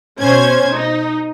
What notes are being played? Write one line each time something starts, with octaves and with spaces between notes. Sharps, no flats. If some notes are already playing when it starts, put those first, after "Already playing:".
B2 C#4 C5 G#6
D#4